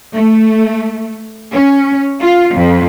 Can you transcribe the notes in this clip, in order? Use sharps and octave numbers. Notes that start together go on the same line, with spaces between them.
A3
C#4
F4
F2